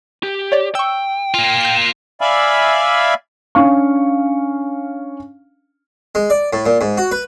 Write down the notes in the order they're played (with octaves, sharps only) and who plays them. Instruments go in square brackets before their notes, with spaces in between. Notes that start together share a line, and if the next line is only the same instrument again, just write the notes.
[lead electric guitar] G4
[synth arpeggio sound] C#5 D5
[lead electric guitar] G5 [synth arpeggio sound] C#6 E6
[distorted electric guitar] A#3 F4
[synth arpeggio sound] G6 C7
[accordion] D5 E5 F5 G#5 B5
[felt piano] C#4 D4 F5 C#6
[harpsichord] G#3
D5
A2
A#2
G#2
F#4
B4